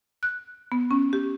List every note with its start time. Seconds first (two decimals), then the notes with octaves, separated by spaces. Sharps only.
0.23 F#6
0.72 B3
0.91 C#4
1.13 G4